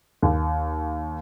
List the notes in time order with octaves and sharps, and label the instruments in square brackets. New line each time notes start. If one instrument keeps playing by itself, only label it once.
[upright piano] D#2